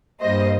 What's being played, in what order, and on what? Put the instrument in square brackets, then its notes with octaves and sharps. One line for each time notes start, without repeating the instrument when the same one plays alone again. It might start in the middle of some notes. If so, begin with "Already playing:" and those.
[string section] G2 G3 A#3 C5 D#5